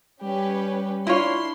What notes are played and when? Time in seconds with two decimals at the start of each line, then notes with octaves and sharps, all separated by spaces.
0.22 G3 C#4 G4 B4
1.07 D4 E4 F4 C#5 C6